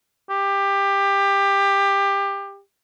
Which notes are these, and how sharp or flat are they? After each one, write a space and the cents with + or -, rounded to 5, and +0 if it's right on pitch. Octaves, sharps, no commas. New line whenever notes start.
G4 +20